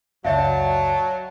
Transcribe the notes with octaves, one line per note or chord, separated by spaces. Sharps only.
C#2 F#2 F#3 D5 E5 F5 A5